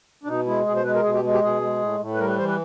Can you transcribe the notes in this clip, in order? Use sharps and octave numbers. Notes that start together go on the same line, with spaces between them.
D4
B2 D#4
G#3 E4
B2 G#4
C5
G#3 B4
A#4
B2 G#4
G4
G#3
G4
B2 G#4
G#3
A2
A2
B4
G3 A#4
B4
E3 C5
B4